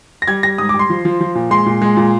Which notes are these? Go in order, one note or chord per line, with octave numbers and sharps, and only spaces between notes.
A#6
G3 G#6
G3 A#6
G#2 D#6
D6
G3
C6
F3
F3
F3
A#2
G#3 C6
A#2
G#3
A#2